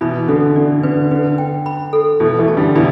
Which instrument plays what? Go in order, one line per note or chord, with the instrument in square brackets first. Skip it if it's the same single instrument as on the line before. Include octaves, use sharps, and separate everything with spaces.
[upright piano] B2 E3 [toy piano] B5
[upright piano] D3 [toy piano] A4
[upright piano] D3 [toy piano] D5
[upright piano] D3 [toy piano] B4
[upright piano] D3 [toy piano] B4
[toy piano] G5
B5
A4
[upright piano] B2 E3 [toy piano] A4
[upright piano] E3 A3
[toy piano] A5
[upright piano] D3 G3
[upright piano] B2 E3 [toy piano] B5